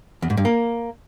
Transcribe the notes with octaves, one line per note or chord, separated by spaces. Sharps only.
E2
G#2
G2
A#3